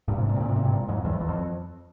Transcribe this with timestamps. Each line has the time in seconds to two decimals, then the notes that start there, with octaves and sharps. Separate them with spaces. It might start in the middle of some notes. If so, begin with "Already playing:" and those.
0.08 G2 A#2
0.18 G#2 C3
0.29 G2 A#2
0.36 C3
0.40 A#2 C#3
0.48 G#2 C3
0.56 A#2 C#3
0.64 G#2 C3
0.72 G2 A#2
0.88 F2 G#2
1.05 E2 G2
1.13 F2
1.21 E2
1.29 F2